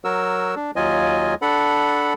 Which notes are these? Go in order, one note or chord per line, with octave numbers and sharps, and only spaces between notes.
F#3 F#4 A#4 E6
D4
D#2 F#3 F4 D#5 G#5
D4 A4 F#5 B5